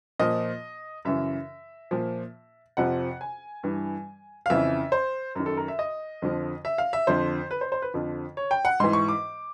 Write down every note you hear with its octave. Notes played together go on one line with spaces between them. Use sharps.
A#2 F3 D#5
F#2 C#3 E3 E5
A#2 F3
F2 C3 F3 F#5
G#5
G2 E3
F5
F2 C#3 E3 E5
C5
F#2 D#3 A#4
A4
A#4
E5
D#5
F2 D3 F3
E5
F5
E5
F2 D3 F3 C5
B4
C5
C5
B4
F2 D3 F3
C#5
G5
F#5
G#2 E3 C6
C#6
D6